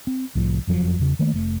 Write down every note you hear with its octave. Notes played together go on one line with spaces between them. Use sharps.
C4
C2 A2 F3
F#1 F2 F3 F#3
E2 C#3
D#3 A3 A#3
F1 A3